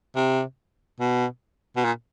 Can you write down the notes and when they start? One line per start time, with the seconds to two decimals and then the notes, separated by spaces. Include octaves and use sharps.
0.16 C3
1.00 B2
1.76 B2
1.84 A#2